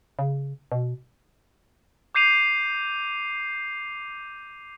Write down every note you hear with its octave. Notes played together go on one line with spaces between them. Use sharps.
C#3
B2
D6 G6 C7 D#7 F7